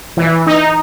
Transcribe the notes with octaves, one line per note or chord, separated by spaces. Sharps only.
E3
D#4